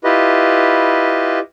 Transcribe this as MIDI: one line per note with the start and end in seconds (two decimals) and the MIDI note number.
0.04 1.39 64
0.04 1.39 65
0.04 1.39 67
0.04 1.39 71
0.04 1.39 75